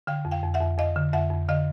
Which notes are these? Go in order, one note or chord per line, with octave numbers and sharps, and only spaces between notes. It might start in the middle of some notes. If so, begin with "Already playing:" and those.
D3 F5 G5
F2
F5 G5
F2
E5 F#5
F2
F2 D#5 F5
D3
F2 E5 F#5
F2
D3 D#5 F5